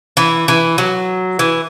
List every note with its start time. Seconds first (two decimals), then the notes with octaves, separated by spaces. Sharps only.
0.17 E3
0.48 E3
0.78 F#3
1.39 E3